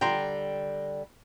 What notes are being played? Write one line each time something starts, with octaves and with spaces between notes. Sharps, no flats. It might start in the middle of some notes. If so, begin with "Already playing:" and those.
D3 G3 G5 A#5 C6